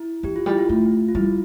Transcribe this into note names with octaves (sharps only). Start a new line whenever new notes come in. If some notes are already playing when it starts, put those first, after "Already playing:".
Already playing: E4
E3 G4
F4
G3 E4
F4
A3
F4
G3 E4